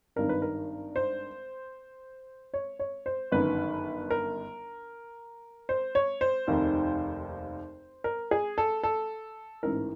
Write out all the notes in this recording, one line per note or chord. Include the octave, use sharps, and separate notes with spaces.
G#1 G2 D#3 A#4
B4
A#4
C5
C#5
C#5
C5
G1 F#2 D#3 B4
A#4
C5
C#5
C5
F1 D#2 D#3
A#4
G#4
A4
A4
A1 G#2 E3 A#4